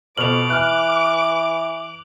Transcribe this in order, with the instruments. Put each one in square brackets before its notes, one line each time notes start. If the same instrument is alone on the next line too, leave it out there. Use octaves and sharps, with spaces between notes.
[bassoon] F2 [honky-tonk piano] B2 F6 [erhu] D6 [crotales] F7 F#7
[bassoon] E3 [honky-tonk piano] F6 F#6